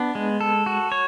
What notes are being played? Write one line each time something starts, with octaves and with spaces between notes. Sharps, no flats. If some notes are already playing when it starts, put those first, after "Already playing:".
Already playing: B3 D4
G#3
A4
F#4
C#5